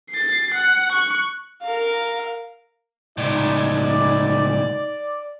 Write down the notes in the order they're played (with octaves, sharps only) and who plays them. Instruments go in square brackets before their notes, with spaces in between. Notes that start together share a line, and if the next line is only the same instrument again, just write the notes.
[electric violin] A6 C7
F#5
C#6 F#6
[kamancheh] A#4 F5
[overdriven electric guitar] C#2 A2 [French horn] D#4 [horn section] D5